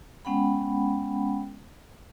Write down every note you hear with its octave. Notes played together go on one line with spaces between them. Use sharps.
G#3 B3 C#4 F#5 G5 B5